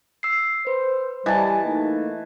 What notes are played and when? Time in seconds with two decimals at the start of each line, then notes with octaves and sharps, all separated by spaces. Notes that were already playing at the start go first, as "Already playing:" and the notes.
0.23 E6 C7
0.67 B4 C5
1.26 E3 G3 D#5 A5
1.64 A3 A#3 D#4